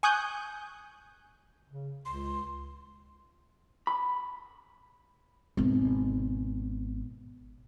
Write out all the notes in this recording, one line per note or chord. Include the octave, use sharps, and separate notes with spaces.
G#5 C#6 D#6 F#6 G6
C#3
C#2 C6
B5
G#1 B2